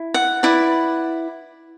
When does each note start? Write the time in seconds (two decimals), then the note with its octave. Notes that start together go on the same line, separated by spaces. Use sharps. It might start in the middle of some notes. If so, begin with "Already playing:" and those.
Already playing: E4
0.14 F#5
0.43 E4 B4 D5